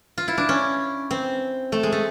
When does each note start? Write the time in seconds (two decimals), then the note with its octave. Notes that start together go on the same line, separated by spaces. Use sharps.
0.18 F4
0.28 E4
0.38 D4
0.49 C#4
1.11 C4
1.72 A3
1.83 G#3
1.92 A3